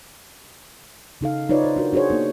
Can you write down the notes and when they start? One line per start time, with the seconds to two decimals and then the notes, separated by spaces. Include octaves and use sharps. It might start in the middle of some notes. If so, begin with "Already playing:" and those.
1.21 C#3 D#4 A4 F5
1.49 D#4 F4 B4 C#5 D5
1.64 C5
1.76 D4 F#4 A#4
1.93 D4 F#4 G#4 C5 C#5
2.10 A#3 B3 D#4